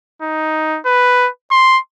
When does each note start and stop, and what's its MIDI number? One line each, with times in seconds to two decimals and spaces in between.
0.22 0.79 63
0.86 1.29 71
1.51 1.78 84